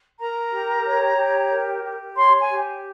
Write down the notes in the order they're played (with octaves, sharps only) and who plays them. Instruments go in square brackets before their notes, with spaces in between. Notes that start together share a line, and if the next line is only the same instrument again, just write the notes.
[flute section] A#4 A#5
G4
C#5
G4
A#4
G4
C#5 C6
G#5
G4